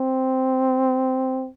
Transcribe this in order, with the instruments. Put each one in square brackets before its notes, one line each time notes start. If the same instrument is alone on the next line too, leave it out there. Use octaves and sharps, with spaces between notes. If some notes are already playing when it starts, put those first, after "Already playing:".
Already playing: [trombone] C4